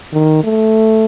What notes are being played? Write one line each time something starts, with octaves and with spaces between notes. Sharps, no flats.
D#3
A3